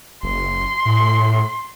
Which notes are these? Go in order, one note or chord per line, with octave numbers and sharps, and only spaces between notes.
F#1 C6
A2